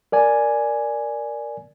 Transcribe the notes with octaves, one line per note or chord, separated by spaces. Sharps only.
A#4 D5 G#5